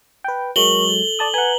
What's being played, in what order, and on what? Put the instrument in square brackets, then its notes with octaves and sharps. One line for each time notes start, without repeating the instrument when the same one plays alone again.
[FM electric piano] B4 G5
[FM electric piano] F#3 G#3 [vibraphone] A#4 C#6 [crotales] F#7 G7
[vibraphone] A4
[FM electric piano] D5 A5 D#6
[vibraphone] B4 A#5 [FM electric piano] F#5 G#5